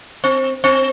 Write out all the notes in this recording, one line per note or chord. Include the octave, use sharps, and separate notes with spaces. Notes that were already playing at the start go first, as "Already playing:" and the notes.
C4
C4